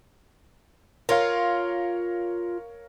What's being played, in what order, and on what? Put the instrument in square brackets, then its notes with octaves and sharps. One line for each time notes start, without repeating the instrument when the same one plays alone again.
[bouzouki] F4 [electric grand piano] A#4 C#5 F5